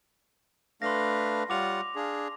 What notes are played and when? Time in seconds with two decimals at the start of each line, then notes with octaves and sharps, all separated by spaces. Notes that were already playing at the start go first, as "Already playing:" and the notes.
0.82 A3 D4 B4 F5 C6 A#6
1.50 G3 F4 C#5 F#5 D6 F7
1.96 D4 G#4 F5